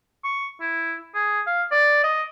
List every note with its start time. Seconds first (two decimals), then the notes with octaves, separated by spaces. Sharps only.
0.25 C#6
0.61 E4
1.15 G#4
1.47 F5
1.72 D5
2.04 D#5